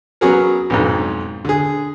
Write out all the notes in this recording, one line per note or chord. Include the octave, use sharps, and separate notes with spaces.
F#3 B3 C#4 F#4 G#4 A#4
B1 F2 G#2
D3 G#4